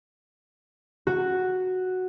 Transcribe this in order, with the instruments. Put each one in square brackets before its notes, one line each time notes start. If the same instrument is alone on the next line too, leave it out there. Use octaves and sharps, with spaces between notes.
[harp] F#4